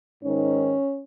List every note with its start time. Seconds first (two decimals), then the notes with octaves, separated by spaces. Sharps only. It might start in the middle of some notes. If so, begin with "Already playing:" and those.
0.22 G#2 D#3 C#4